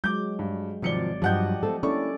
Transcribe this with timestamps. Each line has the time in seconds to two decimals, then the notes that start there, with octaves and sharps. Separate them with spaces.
0.04 F#3 G#3 D6 G6
0.39 G2
0.82 G#1 C3 F3 F#3 D5 C#7 G7
1.22 G2 F3 F#3 G4 D#5 F#5 G6
1.63 A3 C4 A4
1.83 A#3 C#4 D4 E4 A4 D5 C#6